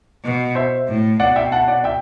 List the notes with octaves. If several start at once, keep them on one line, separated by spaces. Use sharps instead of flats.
B2
C5 E5
A2
B2 D5 F#5
E5 G5
F#5 A5
D5 F#5
E5 G5